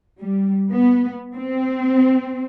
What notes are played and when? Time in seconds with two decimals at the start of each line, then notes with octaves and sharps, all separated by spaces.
0.19 G3
0.72 B3
1.36 C4